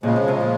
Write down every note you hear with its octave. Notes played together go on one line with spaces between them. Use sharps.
A#2 C#3 F3 G#3
C3
C3
A#2